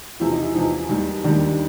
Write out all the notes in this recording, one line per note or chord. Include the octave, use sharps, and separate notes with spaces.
E2 C3 F3 E4
D#4
E4
E2 C3 F3 D#4
D#2 D#3 G3
D#2 D#3 G3 D4